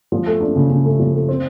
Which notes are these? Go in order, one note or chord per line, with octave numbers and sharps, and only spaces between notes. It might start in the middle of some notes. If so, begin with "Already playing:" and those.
F3
A3
D4
C#3
C#3
A3
F3
A3
C4